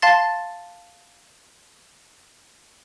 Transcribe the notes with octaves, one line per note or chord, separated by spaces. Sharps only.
F5 A5 C6 A6